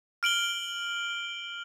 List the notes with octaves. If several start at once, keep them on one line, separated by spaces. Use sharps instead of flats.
F6 D7 F#7 G7